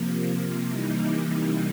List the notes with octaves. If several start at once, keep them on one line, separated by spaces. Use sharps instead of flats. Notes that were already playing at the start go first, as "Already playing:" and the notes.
Already playing: C3 F3 A#3
C3 E3 G3 A#3 D#4